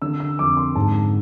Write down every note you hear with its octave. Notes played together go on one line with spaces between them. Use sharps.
D3 E6
E6
F2 D6
C6
G#2 A5